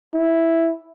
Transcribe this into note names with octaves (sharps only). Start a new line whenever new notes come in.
E4